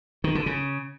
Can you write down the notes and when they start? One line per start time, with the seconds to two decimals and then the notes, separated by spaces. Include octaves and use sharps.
0.24 D#3
0.35 D3
0.46 C#3